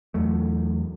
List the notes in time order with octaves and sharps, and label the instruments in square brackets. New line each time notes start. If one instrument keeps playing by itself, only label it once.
[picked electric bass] E2 F#3 A3